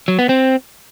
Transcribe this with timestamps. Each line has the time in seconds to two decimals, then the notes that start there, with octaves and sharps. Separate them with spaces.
0.08 F#3
0.19 B3
0.29 C4